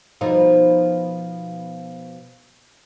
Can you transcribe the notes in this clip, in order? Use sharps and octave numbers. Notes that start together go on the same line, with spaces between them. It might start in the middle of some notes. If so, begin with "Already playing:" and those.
B2 F3 D#4